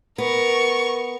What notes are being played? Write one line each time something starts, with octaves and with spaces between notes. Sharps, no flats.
B3 A#4 C#6